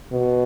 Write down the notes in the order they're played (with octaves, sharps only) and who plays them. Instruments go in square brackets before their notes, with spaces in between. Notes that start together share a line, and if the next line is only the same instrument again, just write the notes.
[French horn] B2